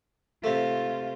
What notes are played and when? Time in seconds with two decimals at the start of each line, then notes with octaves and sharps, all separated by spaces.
0.44 C3 A3 F4